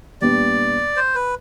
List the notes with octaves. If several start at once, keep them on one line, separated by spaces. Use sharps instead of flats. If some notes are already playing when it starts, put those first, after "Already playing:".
A#2 G3 B3 D4 G4 D5
C5
B4